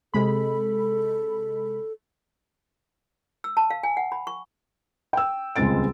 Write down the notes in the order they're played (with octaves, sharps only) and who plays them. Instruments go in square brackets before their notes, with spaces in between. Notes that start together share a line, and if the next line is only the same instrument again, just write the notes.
[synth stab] C3 G#3 B5 [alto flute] A4
[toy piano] E6
A5
F5
G#5
F#5
B5
C#6
[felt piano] G5 E6
D#1 C#2 G#3 C4 A6 D7